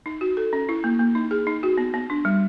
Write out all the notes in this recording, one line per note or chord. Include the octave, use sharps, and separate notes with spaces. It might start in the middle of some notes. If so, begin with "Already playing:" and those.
D#4
F#4
A4
C#4
E4
A#3
A#3
D#4
G#4
D#4
F#4
B3
B3
D4
G3